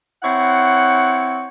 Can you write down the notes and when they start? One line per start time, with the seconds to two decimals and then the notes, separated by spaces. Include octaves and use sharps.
0.23 C4 E4 C#5 F#5